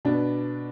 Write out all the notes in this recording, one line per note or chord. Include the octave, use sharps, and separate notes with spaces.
B2 B3 D4